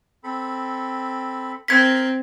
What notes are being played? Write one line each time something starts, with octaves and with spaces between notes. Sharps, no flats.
C4 A4 B5
C4 A#4 G#6 B6